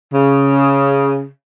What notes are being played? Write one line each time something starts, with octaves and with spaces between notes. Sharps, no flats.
C#3